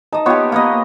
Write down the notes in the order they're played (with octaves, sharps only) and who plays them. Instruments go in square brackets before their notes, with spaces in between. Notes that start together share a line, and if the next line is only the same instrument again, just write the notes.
[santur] D#4 [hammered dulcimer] D#5 A5
[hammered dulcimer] B3 G4 [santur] F4 C#5 C#6
[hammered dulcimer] A#3 B4 D#5